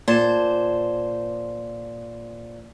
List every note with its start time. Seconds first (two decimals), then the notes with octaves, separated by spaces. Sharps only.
0.08 A#2 C5 A5